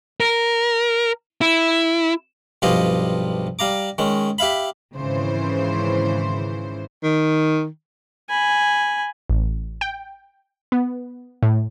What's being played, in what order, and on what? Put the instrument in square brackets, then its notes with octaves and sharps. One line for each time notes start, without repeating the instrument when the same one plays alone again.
[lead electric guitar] A#4
E4
[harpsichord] B1 G2 F3 G4 D#5 F5
G3 F5 A#5 D6
D#3 G#3 C#4
G4 E5 F5 B5
[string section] G#1 C#3 E3 C5
[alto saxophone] D#3
[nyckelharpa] G#5 B5
[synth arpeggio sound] A1
G5
B3
A2